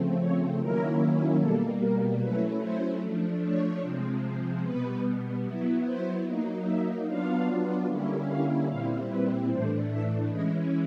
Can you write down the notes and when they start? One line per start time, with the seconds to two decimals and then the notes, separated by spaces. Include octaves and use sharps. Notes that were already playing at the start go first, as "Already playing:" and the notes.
Already playing: C#3 F3 A3 C4
0.19 C#5
0.59 D#3 F#3 A#3 C#4 E4 A#4
1.39 B2 G3 A#3 A4
1.80 A#4
2.20 F#3 A3 C#4 E4 B4
2.60 C5
3.02 F3 A3 D4
3.42 C#5
3.82 C3 F3 G#3 C4
4.63 B2 G3 B3 B4
5.44 F#3 B3 E4
5.84 C5
6.24 F#3 A#3 D#4
6.65 E5
7.06 F#3 B3 D4 F4 F5
7.87 D3 G3 A#3 C#4 E4
8.27 F5
8.68 A#2 G3 C4 E4 F5
9.08 B4
9.48 A2 E3 A3 D4 C5
9.89 E5
10.29 E3 G#3 C#4 E4 D#5